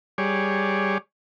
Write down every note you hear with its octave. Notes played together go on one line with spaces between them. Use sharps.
G3 G#4 C#5 D5